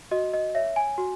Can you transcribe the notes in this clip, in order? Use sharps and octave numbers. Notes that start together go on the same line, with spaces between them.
F#4 D#5
D#5
C#5 E5
G#5
F#4